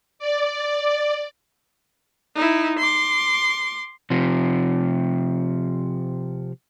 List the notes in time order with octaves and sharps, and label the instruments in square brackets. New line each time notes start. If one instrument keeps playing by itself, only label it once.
[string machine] D5
[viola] D#4 E4
C6 D6
[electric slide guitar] C3 F3